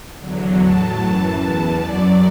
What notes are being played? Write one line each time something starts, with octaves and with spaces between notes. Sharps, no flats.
E2 D3 F#3
A2 F#3 A5
F#2 E3 A5
E2 E3
F#2 F#3 D5